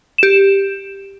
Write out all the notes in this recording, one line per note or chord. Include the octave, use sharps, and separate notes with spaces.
G4 E7